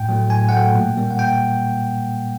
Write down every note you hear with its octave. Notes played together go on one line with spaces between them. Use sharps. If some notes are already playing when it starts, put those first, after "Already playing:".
Already playing: A2 G5
F#3 A3
A2 G#5
F#5
F#3 A3 G5
A#2
G3 A#3
F#5
A#2 G5